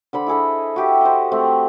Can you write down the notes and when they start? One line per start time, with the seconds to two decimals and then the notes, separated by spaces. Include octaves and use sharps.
0.13 D3 C5 B5
0.27 E4 G#4 A4 D#5
0.76 F#4 G4 E5
1.01 C5 D#5
1.32 A3 C4